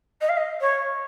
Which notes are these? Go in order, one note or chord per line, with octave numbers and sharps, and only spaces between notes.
D#5
F5
D#5
C#5